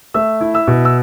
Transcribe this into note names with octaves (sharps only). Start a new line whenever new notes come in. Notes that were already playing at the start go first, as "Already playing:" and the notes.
A3 E5 E6
E4
E5 E6
B2
E6